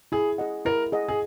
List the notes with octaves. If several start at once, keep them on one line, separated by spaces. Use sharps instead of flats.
E4 G#4
G#4 D#5 F#5
E4 A#4
G#4 D#5 F#5
G#4